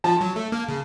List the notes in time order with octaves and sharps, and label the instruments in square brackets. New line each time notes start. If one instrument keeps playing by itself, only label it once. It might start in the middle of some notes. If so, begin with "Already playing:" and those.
[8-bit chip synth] F3 [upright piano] A5
[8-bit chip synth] F#3
A3
A#3
C#3